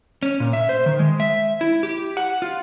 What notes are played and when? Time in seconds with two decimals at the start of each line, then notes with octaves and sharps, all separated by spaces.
0.23 C#4
0.40 A#2
0.53 E5
0.69 C5
0.86 D#3
0.99 G#3
1.20 E5
1.61 E4
1.83 G4
2.17 F#5
2.42 F4